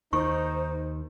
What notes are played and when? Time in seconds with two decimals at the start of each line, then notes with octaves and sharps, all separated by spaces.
0.13 D#2 D#3 D#4 C5 C#6